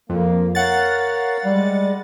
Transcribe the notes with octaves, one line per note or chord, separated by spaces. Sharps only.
F2 A#3
A#4 C#5 F5 F#5 A6
G3 G#3